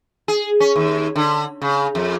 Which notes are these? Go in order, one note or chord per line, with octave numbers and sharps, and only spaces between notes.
G#4
C#4
D#2
D3
C#3
F2